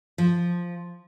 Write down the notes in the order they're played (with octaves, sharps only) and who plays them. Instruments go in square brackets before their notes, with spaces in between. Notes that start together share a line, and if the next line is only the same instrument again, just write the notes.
[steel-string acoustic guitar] F3